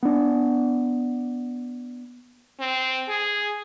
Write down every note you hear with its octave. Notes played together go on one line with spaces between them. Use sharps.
B3 D4
C4
G#4